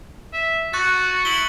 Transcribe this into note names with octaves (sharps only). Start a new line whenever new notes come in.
E5
F#4 C#6 F#6 A6
E4 C#7 F#7 G7